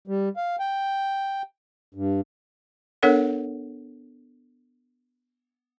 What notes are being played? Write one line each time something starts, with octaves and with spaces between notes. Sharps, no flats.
G3
F5
G5
G2
B3 D4 A4 A#4 C#5 F#5